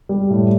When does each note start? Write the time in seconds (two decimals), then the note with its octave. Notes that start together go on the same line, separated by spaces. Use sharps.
0.09 G3
0.30 A2